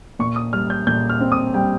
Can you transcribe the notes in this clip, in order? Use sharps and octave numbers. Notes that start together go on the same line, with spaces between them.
A#2 C#6
D#6
G3 F6
G6
A#2 G6
F6
C4
D#6
G3 G5